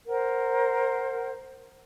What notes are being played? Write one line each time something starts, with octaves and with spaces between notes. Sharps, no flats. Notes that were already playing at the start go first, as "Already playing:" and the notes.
A#4 C5 F#5